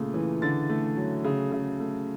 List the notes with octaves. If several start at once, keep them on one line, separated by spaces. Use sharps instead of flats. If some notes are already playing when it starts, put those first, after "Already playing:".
Already playing: A#2 C#3 A3
E3
D3 A6
A3
F#3
C#3
C#3
A3